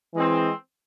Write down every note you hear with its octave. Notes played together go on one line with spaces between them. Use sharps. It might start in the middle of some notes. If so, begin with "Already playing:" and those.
E3 G#3 C4